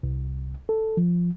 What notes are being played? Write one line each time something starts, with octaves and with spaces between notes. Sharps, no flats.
C2
A4
F3